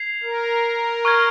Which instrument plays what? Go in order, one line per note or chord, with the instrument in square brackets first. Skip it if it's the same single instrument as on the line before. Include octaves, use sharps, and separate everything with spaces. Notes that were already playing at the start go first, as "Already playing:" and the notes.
Already playing: [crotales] G#6 C7 F7
[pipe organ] A#4
[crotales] C#6 F6 G#6